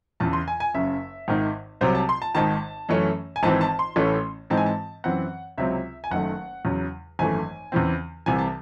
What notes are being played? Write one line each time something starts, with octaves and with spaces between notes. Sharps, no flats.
E2 C#3 E3 A5
C6
G#5
G#5
F#1 F#2 C#3 E5
G#1 G#2 D#3
C2 C3 F#3 C5
A5
C6
A5
G#1 G#2 D#3 A5
F#2 E3 A3 C#4
G#5
G#1 G#2 E3 C4 A5
A5
C6
A1 A2 E3 A3 C#4
G#2 E3 G#3 C4 A5
G#5
A5
F#2 E3 C4 F#5
C#2 C3 F#3 C4 E5
G#5
F#1 F#2 D#3 A3 F#5
E2 C#3 F#3
G#1 F#2 E3 A3 G#5
E2 C#3 E3 C4
C2 C3 E3 G#5
A5